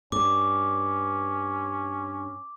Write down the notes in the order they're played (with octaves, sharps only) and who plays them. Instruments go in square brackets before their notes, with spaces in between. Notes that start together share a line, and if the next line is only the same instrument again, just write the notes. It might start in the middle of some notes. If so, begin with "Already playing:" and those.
[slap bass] G2 [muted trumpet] C#4 [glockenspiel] D6